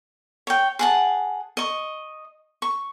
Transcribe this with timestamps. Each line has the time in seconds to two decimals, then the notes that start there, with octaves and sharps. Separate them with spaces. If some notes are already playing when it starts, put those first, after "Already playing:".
0.47 C#5 G5
0.79 G#4 F#5 A5
1.57 D#5 C#6
2.62 C#6